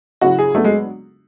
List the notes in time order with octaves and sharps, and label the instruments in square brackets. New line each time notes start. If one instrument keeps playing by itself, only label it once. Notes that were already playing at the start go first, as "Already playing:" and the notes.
[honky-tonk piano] C#3 F#3 C#4 E4 [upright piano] F#4
[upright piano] G#4
[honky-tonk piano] F#3 B3 D4 [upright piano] A3
[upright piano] G#3